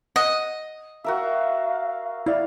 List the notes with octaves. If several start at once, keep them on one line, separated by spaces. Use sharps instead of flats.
D#5 F#5
F#4 A#4 E5 F5
E4 D5 F5